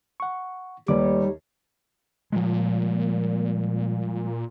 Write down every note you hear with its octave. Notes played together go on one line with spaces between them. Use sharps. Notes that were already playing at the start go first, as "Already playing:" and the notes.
F#5 C#6
D#2 G3 A3 D#4 B4 C#5 D5 D6
A#2 F3 G3 G#3